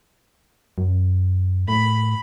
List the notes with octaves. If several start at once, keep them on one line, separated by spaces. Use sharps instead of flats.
F#2
A2 B5